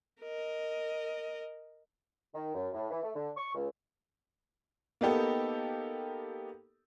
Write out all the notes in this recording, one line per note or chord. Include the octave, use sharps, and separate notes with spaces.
A#4 D#5
D#3
F#2
A2
E3
A3
D3
C#6
C#2
A#3 B3 D#4 G4 A4